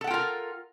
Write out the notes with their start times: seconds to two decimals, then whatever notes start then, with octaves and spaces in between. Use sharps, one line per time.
0.01 A4
0.04 F#5
0.07 G5
0.11 F4
0.14 A#4